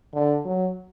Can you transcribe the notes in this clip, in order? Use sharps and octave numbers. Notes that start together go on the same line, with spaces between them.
D3
F#3